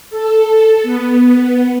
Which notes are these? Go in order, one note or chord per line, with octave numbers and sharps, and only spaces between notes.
A4
B3